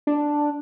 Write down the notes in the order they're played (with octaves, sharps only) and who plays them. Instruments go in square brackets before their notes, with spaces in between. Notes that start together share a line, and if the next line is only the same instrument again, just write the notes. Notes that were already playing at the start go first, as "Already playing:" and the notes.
[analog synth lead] D4